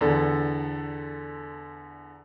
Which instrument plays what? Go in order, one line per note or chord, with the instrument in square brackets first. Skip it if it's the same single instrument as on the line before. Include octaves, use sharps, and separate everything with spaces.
[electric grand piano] E2 D3 A4